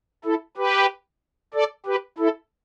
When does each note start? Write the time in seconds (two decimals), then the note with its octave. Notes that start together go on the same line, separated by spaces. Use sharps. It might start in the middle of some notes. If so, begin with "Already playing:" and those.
0.25 E4 A4
0.57 G4 B4
1.54 A4 D5
1.86 G4 B4
2.18 E4 A4